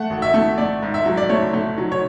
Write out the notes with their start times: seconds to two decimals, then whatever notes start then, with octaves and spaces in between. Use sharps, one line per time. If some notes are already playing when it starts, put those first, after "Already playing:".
Already playing: A3 F#5
0.10 G#1
0.22 E5
0.34 A3
0.58 A3 D5
0.82 G#2
0.94 E5
1.06 F#3
1.17 D5
1.29 A3 C#5
1.53 A3
1.78 F#3
1.92 C#5